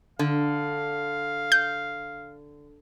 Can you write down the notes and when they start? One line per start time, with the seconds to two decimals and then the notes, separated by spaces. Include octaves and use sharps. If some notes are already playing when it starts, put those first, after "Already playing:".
0.19 D3 F5
1.52 G6